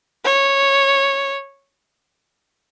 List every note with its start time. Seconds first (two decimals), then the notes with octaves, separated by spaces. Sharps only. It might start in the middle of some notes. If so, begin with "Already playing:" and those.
0.24 C#5